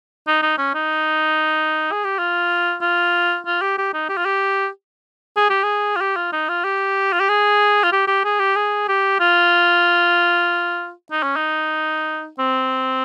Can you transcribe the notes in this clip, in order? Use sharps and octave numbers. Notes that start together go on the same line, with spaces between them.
D#4
D#4
C#4
D#4
G#4
G4
F4
F4
F4
G4
G4
D#4
G4
F4
G4
G#4
G4
G#4
F4
G4
F4
D#4
F4
G4
F4
G4
G#4
F4
G4
G4
G#4
G4
G#4
G4
F4
D#4
C#4
D#4
C4